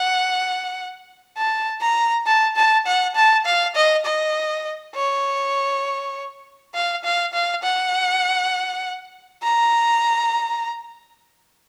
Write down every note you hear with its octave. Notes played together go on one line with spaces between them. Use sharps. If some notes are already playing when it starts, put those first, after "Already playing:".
Already playing: F#5
A5
A#5
A5
A5
F#5
A5
F5
D#5
D#5
C#5
F5
F5
F5
F#5
A#5